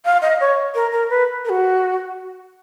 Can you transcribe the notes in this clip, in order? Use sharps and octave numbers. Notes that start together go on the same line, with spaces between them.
F5
D#5
C#5
A#4
A#4
B4
A#4
F#4